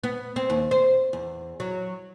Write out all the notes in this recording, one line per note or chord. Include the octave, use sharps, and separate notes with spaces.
B3
C4
D#2
C5
E2
F#3